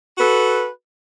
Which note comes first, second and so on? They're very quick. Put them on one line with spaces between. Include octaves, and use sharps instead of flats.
F#4 B4 A4